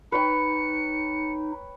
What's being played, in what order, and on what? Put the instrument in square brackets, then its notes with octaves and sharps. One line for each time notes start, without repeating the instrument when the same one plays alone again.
[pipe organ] D#4 [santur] B4 C#5 G5 [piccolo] C#7